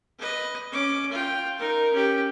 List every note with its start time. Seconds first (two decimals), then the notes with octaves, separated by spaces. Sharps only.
0.19 B4 D#5
0.72 C#4 D6
1.11 F4 G5
1.58 D#4 A#4
1.93 C#4 G4